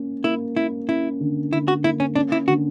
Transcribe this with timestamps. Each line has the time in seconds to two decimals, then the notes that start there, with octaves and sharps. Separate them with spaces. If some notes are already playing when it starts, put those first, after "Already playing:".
Already playing: A#3 C#4
0.24 A#3 E4
0.56 C#4 E4
0.88 C#4 E4
1.21 D3
1.52 D3 E4
1.68 F#4
1.84 A#3 E4
2.00 C#4
2.16 C#4 D4
2.32 E4
2.48 D3 F#4